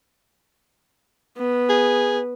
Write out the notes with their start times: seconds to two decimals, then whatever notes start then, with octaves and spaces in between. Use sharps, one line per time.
1.37 B3
1.69 G#4